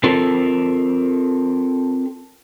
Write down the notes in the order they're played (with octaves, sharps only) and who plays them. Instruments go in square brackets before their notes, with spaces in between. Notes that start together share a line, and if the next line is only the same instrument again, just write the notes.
[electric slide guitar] C4 F4 A4 A#4